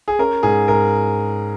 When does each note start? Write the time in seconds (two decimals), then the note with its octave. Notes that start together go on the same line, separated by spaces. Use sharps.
0.08 G#4
0.19 C#4 A#4
0.43 G#2 G#4
0.68 G#2 A#4